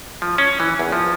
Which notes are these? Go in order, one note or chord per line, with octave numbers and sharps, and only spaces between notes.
F3
C#4
E3
E2
F3